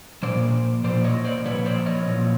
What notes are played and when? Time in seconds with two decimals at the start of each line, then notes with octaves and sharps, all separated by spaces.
0.23 A#2 F3 C5 D5
0.84 A#2 F3 C5 D5
1.04 C#5 D#5
1.24 C5 D5
1.45 A#2 F3 B4 C#5
1.65 C5 D5
1.86 C#5 D#5
2.06 A#2 F3